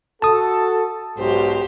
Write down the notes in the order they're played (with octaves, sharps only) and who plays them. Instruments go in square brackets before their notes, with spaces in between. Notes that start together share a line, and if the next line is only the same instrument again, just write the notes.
[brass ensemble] F#4 A4 [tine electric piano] A5 D#6
[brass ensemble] B1 G#2 [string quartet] F#4 G4 C5